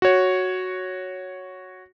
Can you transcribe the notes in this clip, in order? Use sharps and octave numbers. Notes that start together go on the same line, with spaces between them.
F#4 C#5